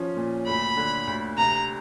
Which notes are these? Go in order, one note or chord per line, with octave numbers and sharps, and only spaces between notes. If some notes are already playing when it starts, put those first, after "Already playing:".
Already playing: F3 C#4
A#2
D2 B5
D3
D2
C3 A#5